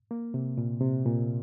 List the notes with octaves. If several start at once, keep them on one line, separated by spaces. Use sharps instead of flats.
A#3
C3
A#2
C3
A#2